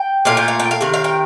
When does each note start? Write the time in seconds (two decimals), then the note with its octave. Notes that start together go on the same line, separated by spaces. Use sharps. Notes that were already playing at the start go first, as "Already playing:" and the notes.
Already playing: G5
0.25 A#2 A3 F5
0.37 G5
0.48 F5
0.59 G5
0.71 F5
0.81 C3 D#3
0.94 F5
1.04 G5